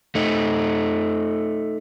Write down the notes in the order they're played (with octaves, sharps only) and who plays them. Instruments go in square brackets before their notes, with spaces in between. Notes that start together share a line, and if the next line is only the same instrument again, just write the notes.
[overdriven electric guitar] A3 D#4